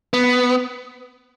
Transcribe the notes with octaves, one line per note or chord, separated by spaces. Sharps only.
B3